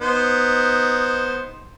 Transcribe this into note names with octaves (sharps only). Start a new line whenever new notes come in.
B3 D#4 C5